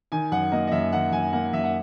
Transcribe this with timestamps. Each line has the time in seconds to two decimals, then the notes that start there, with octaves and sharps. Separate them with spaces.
0.12 D#3 G#5
0.32 F#2 F#5
0.52 A#3 D#5
0.67 D#5
0.72 F#2 E5
0.92 D#3 F#5
1.12 F#2 G#5
1.33 A#3 F#5
1.52 F#2 E5
1.64 F#5